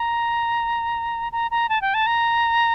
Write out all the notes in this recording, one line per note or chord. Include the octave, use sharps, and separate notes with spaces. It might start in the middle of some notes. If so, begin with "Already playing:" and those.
Already playing: A#5
A#5
A#5
A5
G5
A5
A#5